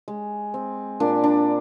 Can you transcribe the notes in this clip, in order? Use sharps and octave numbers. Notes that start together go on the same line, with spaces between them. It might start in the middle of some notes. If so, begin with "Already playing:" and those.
G#3
C4
A#2 D4
D4